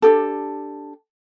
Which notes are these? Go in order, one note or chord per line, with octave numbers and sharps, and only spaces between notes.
D4 D#4 G4 A4